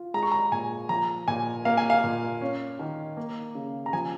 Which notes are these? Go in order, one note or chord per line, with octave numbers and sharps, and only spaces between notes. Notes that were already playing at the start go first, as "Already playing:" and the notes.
Already playing: F4
G#3 A#5
C#6
A#5
A#2 G#5
F3 A#5
A#2 G#5
A#3 F5
G#5
F5
A#2
C#4
D#3
A#3
C#3
A#5
F3 G#5